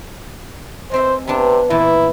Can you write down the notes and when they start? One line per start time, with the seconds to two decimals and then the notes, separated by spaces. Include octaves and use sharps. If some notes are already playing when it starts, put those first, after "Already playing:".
0.91 G#3 C4 C5 E5
1.28 C3 B3 D4
1.70 A#2 E3 E4